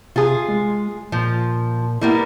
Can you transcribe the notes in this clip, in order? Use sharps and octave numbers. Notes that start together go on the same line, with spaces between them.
C3 F4 G#4
G#3
A#2 F3
G3 A#3 B3 E4